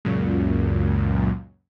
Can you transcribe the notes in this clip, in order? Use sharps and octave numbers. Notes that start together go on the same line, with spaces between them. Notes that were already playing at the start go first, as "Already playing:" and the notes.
C#2 F#2 A#2